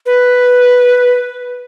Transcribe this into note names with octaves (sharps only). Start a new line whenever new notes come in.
B4